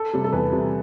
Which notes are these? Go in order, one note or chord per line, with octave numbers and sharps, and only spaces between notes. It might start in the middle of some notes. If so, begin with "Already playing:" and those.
Already playing: A4
C3 G3
A4
E2 B4
C3 G3